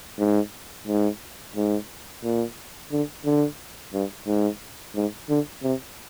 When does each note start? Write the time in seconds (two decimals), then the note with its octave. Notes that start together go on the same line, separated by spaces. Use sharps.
0.19 G#2
0.88 G#2
1.56 G#2
2.24 A#2
2.92 D3
3.25 D3
3.93 G2
4.27 G#2
4.95 G#2
5.29 D3
5.63 C3